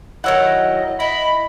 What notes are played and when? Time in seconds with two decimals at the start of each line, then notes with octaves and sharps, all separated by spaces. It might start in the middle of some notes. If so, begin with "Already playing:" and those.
0.24 D#3 F#3 E4 D#5 F#5 E6 G#6
1.00 E4 D#5 B5